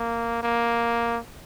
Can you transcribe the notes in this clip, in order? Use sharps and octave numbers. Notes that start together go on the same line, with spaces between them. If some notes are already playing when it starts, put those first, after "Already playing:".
Already playing: A#3
A#3